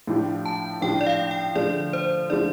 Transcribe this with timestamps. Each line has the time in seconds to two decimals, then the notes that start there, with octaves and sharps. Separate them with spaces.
0.07 A2 F3 D4 G4
0.46 A5
0.81 A2 F3 D4 G4 G5
1.01 D5
1.06 F5
1.31 G5
1.55 D3 F3 A3 D5
1.93 C5
2.30 D3 F3 A3 D5